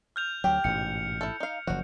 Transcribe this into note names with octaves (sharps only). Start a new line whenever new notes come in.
F6 G6 F7
D2 F#3 G4
A1 G#2 B2 C#7
E4 A4
D#4 F5
F#1 F3 F#4